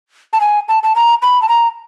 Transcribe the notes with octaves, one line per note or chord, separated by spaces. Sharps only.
A5
G#5
A5
A5
A#5
B5
A5
A#5